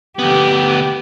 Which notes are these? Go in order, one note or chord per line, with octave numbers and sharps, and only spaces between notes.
D2 B3 G4